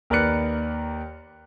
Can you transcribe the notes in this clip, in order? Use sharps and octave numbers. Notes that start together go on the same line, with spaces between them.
D#2 A#4 B4 D5 F#6 C#7